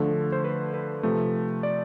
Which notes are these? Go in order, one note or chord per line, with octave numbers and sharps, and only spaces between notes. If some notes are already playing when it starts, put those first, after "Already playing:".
Already playing: D3 F3 A3
C5
B4
B4
C3 F3 A3
D5